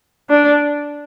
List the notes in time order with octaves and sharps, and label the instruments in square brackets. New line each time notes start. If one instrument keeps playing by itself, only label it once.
[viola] D4